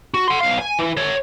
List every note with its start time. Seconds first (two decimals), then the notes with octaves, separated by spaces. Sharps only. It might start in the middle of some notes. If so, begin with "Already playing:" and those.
0.14 F#4
0.28 F#5 C6
0.41 B1 F5
0.59 G#5
0.79 E3
0.97 C#5 E5